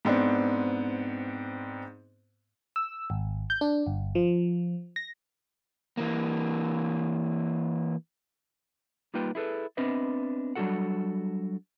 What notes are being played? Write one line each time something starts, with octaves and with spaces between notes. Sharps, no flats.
G#2 B3 C4 D4
E6
G#1
G6
D4
G1
F3
A#6
E3 A#3
G3 A#3 D#4 F4 B4 G5
E4 G#4 A4 B4
B3 C4 D4 B4 D#5 E5
F#3 G3 D4 F#4 A4 F#5